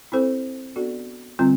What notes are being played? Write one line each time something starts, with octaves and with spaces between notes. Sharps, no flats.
C4 E4 A4 C5
B3 D4 F#4 A4 D5
D3 G3 C4 F4